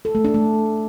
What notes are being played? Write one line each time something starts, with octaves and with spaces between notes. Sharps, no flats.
A4
A3
D4
A3